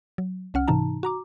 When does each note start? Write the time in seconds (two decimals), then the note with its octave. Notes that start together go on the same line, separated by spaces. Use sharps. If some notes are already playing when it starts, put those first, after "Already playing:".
0.18 F#3
0.54 C2 C#4 F#5 F6
0.68 G#2 C3 E3 D#4 A5 A#5
1.03 F#4 A#5 D6